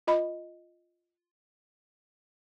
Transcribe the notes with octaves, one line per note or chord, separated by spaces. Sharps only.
F4 D#5 B5